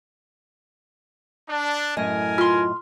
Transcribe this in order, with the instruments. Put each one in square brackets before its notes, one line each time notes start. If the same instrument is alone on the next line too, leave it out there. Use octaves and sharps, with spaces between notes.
[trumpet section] D4
[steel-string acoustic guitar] F#2 A2 D#5 [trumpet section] A#4 G#5
[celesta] F4 [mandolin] C6 F6